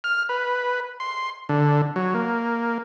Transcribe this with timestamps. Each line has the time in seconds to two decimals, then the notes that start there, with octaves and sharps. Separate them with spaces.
0.04 F6
0.29 B4
1.00 C6
1.49 D3
1.96 F#3
2.14 A#3